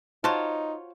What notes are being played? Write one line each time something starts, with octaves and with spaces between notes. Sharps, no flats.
D#4 F4 F#4 C5 C#5 A5